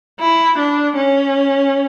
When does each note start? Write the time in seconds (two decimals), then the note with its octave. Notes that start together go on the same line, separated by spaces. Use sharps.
0.20 E4
0.58 D4
0.97 C#4